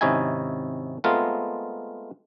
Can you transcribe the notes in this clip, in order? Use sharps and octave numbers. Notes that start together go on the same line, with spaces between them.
G#1 C3 C#4 D#4 E4 G#5
G#3 A3 B3 C4 F4 A#4